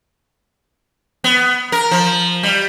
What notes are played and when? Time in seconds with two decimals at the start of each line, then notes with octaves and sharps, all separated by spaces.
1.24 B3
1.72 A#4
1.91 F3
2.43 G3